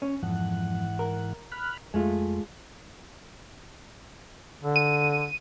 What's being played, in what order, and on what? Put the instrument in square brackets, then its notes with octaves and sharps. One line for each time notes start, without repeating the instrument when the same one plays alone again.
[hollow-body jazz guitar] C#4
[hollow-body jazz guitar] F2 [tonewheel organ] G#2 E3 F#5
[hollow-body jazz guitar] A#4
[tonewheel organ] B5 F6 F#6
[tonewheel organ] F2 [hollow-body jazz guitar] G#3 A3 F4
[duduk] D3
[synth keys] D#7